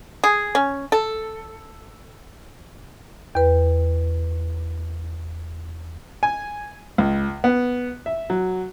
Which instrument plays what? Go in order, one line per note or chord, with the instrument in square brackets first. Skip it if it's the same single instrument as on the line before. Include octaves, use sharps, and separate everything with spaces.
[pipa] G#4
C#4
A4
[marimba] E2 B4
[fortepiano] G#5
C#2
B3
E5
F#3